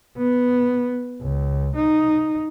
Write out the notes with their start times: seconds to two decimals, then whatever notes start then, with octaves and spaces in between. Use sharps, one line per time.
0.18 B3
1.21 C#2
1.76 D#4